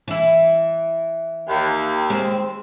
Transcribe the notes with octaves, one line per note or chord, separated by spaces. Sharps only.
E3 E4
D#2
G#3 C4